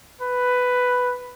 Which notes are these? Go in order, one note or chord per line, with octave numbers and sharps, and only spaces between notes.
B4